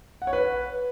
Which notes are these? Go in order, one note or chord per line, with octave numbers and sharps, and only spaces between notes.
F#5
C#5
B4